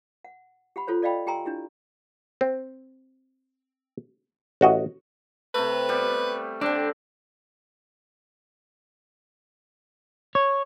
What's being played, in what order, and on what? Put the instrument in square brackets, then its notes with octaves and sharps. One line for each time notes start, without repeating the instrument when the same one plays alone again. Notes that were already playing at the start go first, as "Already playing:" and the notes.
[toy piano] F#5
G4 F#5 B5
F4 A4 C5 C#5
A4 D5 D#5 F5 G5 B5
G4 G5 G#5 A#5 C6 E6
D4 E4 G4
[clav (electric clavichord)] C4
A1 F#4 D#5
[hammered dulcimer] C3 A3 [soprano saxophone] B4
[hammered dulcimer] G3 B3 G4
[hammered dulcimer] D3 C4 [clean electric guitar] D4
[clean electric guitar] C#5